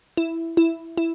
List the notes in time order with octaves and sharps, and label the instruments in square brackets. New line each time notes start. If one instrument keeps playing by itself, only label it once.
[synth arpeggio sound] E4
E4
E4